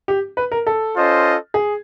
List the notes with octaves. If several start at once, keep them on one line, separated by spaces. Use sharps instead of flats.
G4
B4
A#4
A4
C#4 F4 A4 C5 D#5
G#4